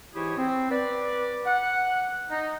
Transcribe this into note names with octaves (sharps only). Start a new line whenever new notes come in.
G#2 E3 E4 G4 G#4 C#5
C4
B4 D5
F#5
D#4